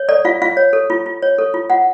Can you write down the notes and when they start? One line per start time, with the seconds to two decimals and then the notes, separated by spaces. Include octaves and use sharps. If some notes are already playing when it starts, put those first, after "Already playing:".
Already playing: C#5
0.09 A4 D5
0.25 F4 F5
0.42 F4 F5
0.57 C#5
0.73 A4
0.90 F4
1.06 F4
1.22 C#5
1.38 A4
1.54 F4
1.70 F4 F#5